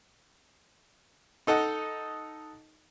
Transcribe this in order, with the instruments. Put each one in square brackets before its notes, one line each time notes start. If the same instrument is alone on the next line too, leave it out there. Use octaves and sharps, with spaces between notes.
[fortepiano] D#4 A4 D#5 F#5